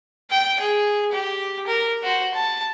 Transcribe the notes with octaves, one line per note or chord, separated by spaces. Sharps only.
G5
G#4
G4
A#4
F#4 C5
A5